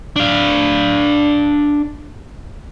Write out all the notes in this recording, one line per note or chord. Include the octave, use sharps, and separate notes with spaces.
D4 F5